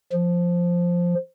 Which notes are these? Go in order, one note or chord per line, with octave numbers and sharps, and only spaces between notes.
F3